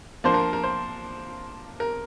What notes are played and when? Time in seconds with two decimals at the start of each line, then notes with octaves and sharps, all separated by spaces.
0.24 F3 A#3 D4 C5
0.34 A#4
0.53 A#4
0.63 C5
1.80 A#4